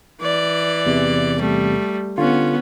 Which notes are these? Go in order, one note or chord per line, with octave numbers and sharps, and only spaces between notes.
E3 D5
E2 C3
G3 A3
D3 B3 C#4 F4